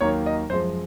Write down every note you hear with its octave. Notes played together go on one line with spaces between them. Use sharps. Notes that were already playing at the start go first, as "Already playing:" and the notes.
D#2 D#3 F#3 A#3 C#5
D#5
F#2 F3 G#3 C5